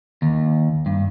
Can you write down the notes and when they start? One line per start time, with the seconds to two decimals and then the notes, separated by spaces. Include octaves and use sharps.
0.22 D#2
0.86 G2